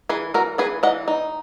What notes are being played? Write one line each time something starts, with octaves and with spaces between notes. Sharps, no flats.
E3 G#4 B4
E3 F#4 A#4
E3 G#4 B4
E3 D#5 F#5
D#4